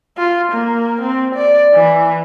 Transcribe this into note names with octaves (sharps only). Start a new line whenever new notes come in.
F4
A#3
C4
D5
E3